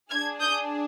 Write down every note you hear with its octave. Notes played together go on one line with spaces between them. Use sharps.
D4 G#4 F6 G#6
D#6 G6